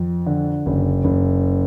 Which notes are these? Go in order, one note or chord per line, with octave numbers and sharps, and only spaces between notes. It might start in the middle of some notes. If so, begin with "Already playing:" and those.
Already playing: F2
D3
F#1
F#1